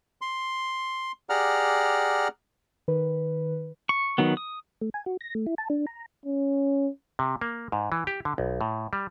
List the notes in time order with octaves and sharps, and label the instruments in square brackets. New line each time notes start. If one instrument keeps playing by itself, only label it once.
[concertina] C6
G4 G#4 D5 F#5 A#5 F6
[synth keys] D#3 B4
[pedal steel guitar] C#6
D#3 F#3 B3
D#6
[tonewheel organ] A3
G#5
F#4
A#6
A3
E4
A5
D4
A#5
[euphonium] C#4
[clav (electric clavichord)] C3
A#3
G#2
E3
G4
D3
B1
A2
G3